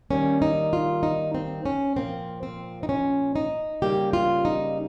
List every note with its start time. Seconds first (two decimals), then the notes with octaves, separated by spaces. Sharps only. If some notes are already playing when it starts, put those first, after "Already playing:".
0.10 D#3 G3 A#3 C#4
0.42 D#4
0.73 F4
1.03 D#4
1.35 C4
1.66 C#4
1.96 A#2 F3 A#3 C4
2.43 C4
2.83 D#4
2.89 C#4
3.36 D#4
3.82 C#3 G3 A#3 G4
4.13 F4
4.45 D#4